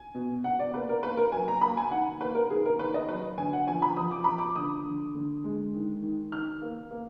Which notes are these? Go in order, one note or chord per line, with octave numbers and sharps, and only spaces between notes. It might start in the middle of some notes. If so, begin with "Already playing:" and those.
Already playing: G#5
B2
B2 F#5
D5
A#3 B4
A#4
A#3 B4
A#4
F#3 G#5
A#5
A#3 B5
G#5
D#3 F#5
A#3 B4
A#4
D#3 G#4
A#4
D#3 B4
D#5
F#3 B4
D3 G#5
F#5
F3 G#5
B5
F3 D#6
D6
F3 B5
D6
D3 D#6
D3
D3
G#3
D#3
D#3
D#3 F6
A#3
A#3